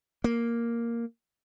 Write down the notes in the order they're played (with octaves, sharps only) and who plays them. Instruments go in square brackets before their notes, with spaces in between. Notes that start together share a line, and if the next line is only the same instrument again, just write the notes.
[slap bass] A#3